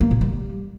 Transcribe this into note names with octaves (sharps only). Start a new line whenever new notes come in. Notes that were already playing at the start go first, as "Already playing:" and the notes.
A#3
A#2
G3